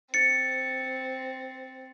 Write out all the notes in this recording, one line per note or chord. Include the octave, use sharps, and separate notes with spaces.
C4 A6 C#7